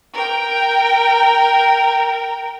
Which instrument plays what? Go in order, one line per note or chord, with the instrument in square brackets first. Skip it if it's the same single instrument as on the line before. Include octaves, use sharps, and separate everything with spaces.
[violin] A#4 G5